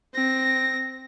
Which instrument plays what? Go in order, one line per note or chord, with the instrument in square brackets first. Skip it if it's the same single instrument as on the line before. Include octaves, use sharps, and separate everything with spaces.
[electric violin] C4 A#6